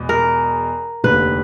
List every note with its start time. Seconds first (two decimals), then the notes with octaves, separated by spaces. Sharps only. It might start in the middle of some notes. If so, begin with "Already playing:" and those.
Already playing: E2 B2 G#3
0.09 A#4
1.04 F1 D#2 D3 B4